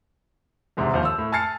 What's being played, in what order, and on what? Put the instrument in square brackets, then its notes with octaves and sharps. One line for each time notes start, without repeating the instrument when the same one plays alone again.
[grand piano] E2 G#2 C3
D#2 F3 C5 F5
E6
A2
G#5 A5 F6 A6 C7 C#7